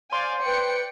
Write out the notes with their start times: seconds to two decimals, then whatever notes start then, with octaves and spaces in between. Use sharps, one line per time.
0.13 C5 D5 F5 G#5 C6
0.46 B4 D5 G5 C#7